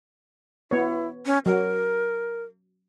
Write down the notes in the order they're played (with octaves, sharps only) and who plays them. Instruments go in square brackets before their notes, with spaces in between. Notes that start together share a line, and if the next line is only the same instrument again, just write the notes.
[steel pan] B3 C#5 [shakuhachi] E4
[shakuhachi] C#4
[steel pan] F#3 [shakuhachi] A#4